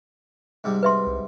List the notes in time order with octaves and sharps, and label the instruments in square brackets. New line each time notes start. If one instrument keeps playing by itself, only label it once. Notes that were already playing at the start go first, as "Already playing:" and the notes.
[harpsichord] G#2 C3 G3
[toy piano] B4 E5 C6
[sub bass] C2